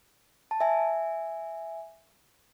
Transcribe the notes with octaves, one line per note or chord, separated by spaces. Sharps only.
A5
E5 G#5